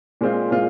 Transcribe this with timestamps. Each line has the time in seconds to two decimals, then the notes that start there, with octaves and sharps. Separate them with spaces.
0.21 A#2 G#3 C4 F4
0.51 A#2 G#3 C4 F4